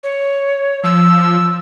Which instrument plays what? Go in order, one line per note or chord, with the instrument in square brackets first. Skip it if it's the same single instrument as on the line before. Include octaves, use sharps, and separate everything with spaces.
[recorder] C#5
[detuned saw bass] F3 [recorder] E6